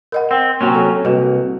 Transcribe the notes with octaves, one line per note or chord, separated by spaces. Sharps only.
A#4 D#5 F#5
C4
C3 F#3 A#3 C#4
A4
C2 F#4 B4 D#5